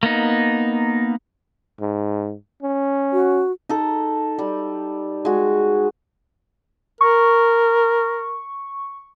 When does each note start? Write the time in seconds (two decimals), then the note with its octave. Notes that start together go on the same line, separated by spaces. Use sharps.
0.03 A#3 B3 D#4
1.80 G#2
2.63 C#4
3.13 F#4
3.69 D#4 A4
4.39 G3
5.25 G#3 F#4
7.01 A#4 C#6